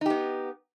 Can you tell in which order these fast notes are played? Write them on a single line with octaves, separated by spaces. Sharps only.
D#4 G4 B3